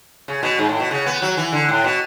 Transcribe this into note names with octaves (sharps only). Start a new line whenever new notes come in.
C#3
B2
G#2
A2
B2
C#3
B3
F#3
E3
D3
A2
B2